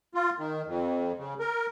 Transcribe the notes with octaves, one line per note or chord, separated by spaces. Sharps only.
F4
D#3
F2
C#3
A#4